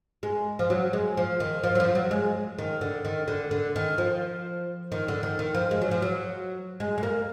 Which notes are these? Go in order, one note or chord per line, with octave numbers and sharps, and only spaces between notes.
G#3
F3
F#3
G#3
F3
D#3
F3
F#3
F3
F#3
G#3
D#3
D3
D#3
D3
D3
D#3
F3
D#3
D3
D#3
D#3
F3
G#3
F#3
F3
F#3
G#3
G#3
A#3